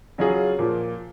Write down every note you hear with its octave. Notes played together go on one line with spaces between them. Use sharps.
C#3 F#3 C#4 F4 G#4
A#2 F3 A#3